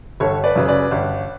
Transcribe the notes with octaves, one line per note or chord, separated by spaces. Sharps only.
G1 A4 C#5
B4 D5
F#2 C#3
B4 D5
G1